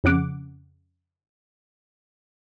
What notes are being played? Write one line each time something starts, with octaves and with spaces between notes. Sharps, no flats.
F2 C#3 F#5 D6